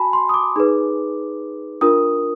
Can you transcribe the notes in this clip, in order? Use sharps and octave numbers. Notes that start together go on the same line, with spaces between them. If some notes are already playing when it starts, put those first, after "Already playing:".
Already playing: F#4 G#5 A5 B5
C6
D#6
D6
D#4 G#4 B4
D4 F4 A#4 D#6